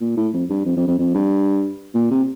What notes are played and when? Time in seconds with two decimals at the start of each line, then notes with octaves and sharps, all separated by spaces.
0.01 A#2
0.17 A2
0.33 F2
0.50 G2
0.66 F2
0.77 F2
0.87 F2
0.98 F2
1.14 G2
1.95 A#2
2.11 C3